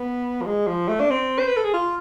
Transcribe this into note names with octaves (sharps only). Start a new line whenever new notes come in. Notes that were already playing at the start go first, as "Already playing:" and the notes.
Already playing: B3
F3
G#3
F3
A3
D4
C4
C5
B4
A4
G#4
F4